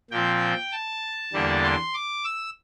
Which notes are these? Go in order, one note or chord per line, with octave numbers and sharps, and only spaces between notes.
A#2 F3 C4 G5
A5
E2 D3 G3 A#3 D4
C6
D6
E6